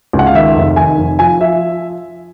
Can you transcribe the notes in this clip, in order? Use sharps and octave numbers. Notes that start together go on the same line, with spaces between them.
C#2
F#5
F5
D#3 E5
F1
D#3 G#5
F1
F3 G#5
F3 E5